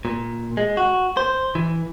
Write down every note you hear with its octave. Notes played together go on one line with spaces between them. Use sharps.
A#2
G#3
F#4
C5
E3